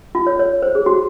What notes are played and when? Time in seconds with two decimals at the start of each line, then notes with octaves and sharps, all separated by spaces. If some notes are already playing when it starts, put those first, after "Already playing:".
0.15 F4
0.27 C#5
0.39 C#5
0.62 C5
0.75 G#4
0.86 F#4